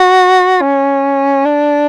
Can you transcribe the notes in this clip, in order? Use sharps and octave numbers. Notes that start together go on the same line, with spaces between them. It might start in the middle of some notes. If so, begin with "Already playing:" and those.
Already playing: F#4
C#4
D4